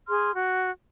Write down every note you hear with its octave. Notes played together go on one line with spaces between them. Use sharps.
G#4 C6 F6
F#4